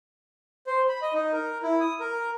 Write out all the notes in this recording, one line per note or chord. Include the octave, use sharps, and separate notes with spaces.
C5
B5
D#5
D#4
A#4
E4
D#6
A#4